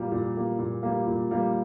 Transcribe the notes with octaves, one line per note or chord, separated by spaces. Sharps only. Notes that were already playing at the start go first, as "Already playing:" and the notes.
Already playing: A#2 G3 A#3
A#2
G3 A#3
A#2
G3 A#3
A#2
G3 A#3